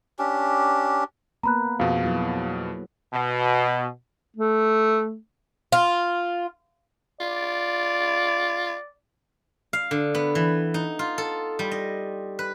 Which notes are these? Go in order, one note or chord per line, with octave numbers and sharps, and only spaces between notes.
C#4 D4 G4
A#3 B3 B4 A#5 B5 F#6
F2 B2 G#4 F5
F#3 E4 B4
B2
A3
F4
F4 D5
F5
D3
B3
E3
D#4
F4
A4
G3
D#5
B4